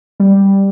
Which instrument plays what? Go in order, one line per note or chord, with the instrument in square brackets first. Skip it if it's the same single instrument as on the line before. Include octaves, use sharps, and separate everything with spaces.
[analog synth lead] G3